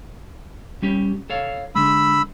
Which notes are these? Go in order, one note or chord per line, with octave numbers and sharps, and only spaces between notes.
G3 C#4 G4
A4 C#5 F5
D3 G#3 B5 E6